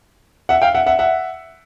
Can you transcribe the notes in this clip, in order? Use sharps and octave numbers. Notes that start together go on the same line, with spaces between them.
E5 F#5
F5 G5
E5 F#5
E5 F#5
E5 F#5